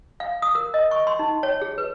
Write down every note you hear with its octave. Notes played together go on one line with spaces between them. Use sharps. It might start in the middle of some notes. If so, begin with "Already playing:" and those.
F5
D#6
A#4
D#5
C#6
C6
D#4
C#5
G#4
B4